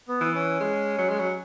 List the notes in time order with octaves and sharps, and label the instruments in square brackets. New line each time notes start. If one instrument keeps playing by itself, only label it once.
[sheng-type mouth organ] B3
[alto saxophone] E3
[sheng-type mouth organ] C#4
[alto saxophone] G#3
F#3
G#3
F#3